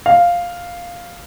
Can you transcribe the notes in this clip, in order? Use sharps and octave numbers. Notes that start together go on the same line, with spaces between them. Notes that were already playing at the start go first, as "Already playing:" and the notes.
F5